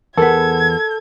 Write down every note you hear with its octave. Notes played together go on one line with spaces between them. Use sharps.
E2 B3 A4 A#4 G#6